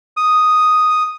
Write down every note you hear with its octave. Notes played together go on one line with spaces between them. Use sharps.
D#6